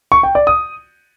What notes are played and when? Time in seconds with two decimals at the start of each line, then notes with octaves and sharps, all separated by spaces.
0.12 C#6
0.23 G5
0.35 D5
0.47 D#6